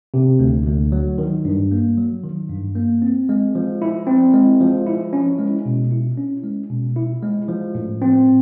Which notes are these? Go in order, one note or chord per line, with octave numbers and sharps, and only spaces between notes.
C3
D2
D2
F#3
D#3
G2
A#3
F#3
D#3
G2
A#3
C4
G#3
F3
E4
C4
G#3
F3
E4
C#4
G#3
B2
E4
C#4
G#3
B2
E4
G#3
F3
A2
C4